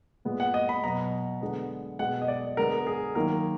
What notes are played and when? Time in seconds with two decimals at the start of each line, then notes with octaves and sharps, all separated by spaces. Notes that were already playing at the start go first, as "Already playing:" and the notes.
0.25 A#2 G#3 B3
0.40 F#5
0.54 D#5
0.69 B5
0.84 B2 F#3 B3 A#5
1.41 D3 G#3 B3
1.99 B2 G#3 B3 F#5
2.22 D#5
2.28 D5
2.57 D3 G#3 B3 A#4
2.87 G#4
3.15 D#3 F#3 A#3 A#4